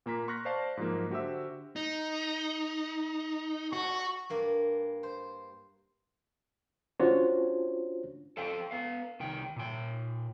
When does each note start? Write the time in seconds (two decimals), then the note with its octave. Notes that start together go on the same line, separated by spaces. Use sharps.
0.06 A#2 A#3 A#5 B6
0.28 C6 C#6 F6 F#6 A#6 B6
0.45 C5 D5 F5 A5
0.77 G#2 F3 F#3 A#3
1.10 D3 F#4 G4 C5 E5 E6
1.76 D#4
3.73 F#4 C#6
4.30 G2 A#3
5.03 C5
7.00 C#4 D4 F4 F#4 C5 C#5
8.37 A4 C5 F5 G5
8.71 B3 F5
9.20 C2 D#3 G5
9.56 A#2 G5